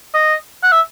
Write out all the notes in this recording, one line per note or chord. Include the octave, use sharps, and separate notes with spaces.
D#5
F#5
E5